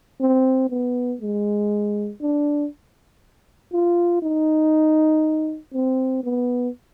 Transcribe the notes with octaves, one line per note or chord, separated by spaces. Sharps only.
C4
B3
G#3
D4
F4
D#4
C4
B3